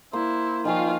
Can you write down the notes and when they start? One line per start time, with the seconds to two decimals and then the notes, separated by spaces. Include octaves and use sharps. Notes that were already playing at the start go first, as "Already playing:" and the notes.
0.13 A#3 E4 C5
0.65 D#3 F3 F4 G#5 C#6